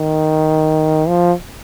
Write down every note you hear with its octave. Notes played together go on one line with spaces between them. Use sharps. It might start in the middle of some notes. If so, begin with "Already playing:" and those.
Already playing: D#3
F3